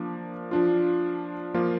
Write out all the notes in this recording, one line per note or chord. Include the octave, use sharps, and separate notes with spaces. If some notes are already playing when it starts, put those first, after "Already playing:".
Already playing: F3 A#3 D4
F3 D4 F4
F3 A#3 F4